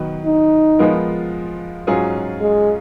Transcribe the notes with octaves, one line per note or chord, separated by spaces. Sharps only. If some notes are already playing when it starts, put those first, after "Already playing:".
Already playing: D#3 F#3 B3
D#4
F3 G#3 B3 F4 A#4
G#2 F#3 C#4 F4 G#4
G#3